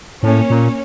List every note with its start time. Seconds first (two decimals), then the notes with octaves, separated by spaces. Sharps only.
0.23 A2 A#3 C#4
0.50 A#2